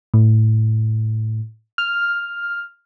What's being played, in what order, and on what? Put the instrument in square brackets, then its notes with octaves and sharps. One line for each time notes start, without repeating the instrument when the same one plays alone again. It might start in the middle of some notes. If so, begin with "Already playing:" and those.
[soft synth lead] A2
F6